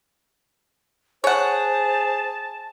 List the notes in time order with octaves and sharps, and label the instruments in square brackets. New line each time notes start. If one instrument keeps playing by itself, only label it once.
[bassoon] G#4 [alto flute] C5 [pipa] C#5 F#5 [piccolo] A5